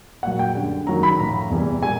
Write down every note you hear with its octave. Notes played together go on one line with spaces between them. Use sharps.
A#2 F#3 F#5
G5
F#2 D3 G3
F#2 D#3 F#3 A#5
B5
A2 F3 A#5
E2 C3 E3 G3
A#2 G3 G#5